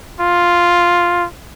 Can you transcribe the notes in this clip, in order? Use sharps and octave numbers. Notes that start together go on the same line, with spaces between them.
F4